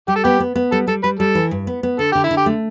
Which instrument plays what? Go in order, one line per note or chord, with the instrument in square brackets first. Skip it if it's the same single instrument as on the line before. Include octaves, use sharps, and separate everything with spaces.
[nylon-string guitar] G3 [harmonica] G4
[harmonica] A4
[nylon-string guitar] B3 [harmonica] G4
[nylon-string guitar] B3
B3
[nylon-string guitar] G3 [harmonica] A4
[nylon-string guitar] G3 [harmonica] A4
[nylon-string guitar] G3 [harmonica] B4
[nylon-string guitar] G3 [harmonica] A4
[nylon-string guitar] E3
G2
B3
B3
[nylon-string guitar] D3 [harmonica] A4
[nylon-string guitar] D3 [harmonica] G4
[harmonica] E4
[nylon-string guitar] D3
[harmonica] G4
[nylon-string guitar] A3